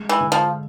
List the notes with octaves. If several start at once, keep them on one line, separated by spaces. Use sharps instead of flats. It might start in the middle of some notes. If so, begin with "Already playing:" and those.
Already playing: G#3
E3
D3
F3